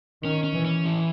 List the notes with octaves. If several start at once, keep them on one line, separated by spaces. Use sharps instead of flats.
D#3 C#4
C#4
E3
C#4
E3